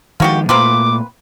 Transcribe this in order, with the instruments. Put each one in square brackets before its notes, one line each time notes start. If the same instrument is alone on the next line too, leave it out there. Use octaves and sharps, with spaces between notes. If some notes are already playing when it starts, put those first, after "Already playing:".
[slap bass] D#3 F3 G#3 [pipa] A#3 F#4 G4
[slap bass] A#2 A3 [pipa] A#3 C4 B4 [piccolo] D6